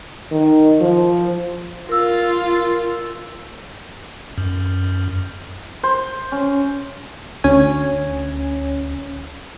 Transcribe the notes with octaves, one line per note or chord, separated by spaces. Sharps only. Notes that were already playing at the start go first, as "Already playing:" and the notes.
D#3
F3
F4 A#4 E6
F#2
C5
C#4
D2 C#4 G#5